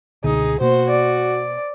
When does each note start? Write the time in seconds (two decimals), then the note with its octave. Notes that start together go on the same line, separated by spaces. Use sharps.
0.24 C#2 B2 D3 D#4 G#4
0.61 B2 A#3 F#4 C5
0.90 D5